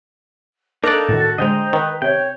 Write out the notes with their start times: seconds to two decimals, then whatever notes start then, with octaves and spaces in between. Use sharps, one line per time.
0.84 A#3 D4 D#4 A4 A#4 D5 A#5 F#6
1.09 A2 D#3 F#4
1.38 D3 G#3 C5 D#5 G5 A#5
1.73 D#3 B4
2.02 C3 C#5 G5